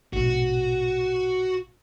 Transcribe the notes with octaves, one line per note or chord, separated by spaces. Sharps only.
A#1 G#2 B2 F#4